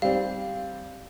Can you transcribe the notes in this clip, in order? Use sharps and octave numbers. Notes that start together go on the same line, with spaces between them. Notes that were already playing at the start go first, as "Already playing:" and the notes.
G3 C4 F5